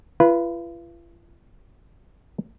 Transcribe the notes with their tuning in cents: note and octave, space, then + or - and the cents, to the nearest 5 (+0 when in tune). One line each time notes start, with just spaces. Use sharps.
F4 -45 B4 -15